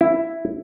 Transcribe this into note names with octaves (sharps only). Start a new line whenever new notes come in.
E4